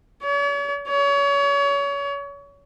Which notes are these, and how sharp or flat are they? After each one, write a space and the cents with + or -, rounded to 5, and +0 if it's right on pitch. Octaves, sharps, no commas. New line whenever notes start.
C#5 +45
C#5 +30